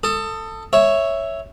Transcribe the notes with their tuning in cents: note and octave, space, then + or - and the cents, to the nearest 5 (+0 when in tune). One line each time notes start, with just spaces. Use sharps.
A4 +20 D#6 +0
C#5 +0 E5 +0